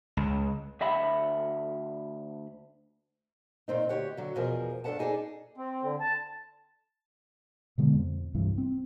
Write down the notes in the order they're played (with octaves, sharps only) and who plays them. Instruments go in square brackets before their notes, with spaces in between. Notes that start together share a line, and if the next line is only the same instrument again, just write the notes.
[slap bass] C#2
[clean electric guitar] D2 D#5 E5 F#5 B5
[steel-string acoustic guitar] A#2 D#3 C4 D#4
D2 G4 C#5 F#5
D3 F#3 F#4
E2 B2 F3 G#4 A#4
G2 D4 A4 B4 F#5 A5
D#4 G#4 A4 C5 D5
[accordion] C4
D3
A5
[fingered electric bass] B2 D3 G#3 B3
F2
C2 G2 C3 E3
C4